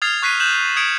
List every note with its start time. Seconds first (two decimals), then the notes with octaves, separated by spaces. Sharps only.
0.02 D#6 F6 G#6 A6 C7 F7
0.23 C#6 F#6 B6 C7 D#7
0.40 F#6 G6 E7 F#7
0.76 D#6 G#6 C#7 D7